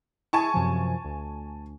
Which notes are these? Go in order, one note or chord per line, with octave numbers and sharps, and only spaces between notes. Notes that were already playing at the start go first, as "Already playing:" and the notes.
E4 G#4 G#5 A5 C#6
F#2 C3 F3
D2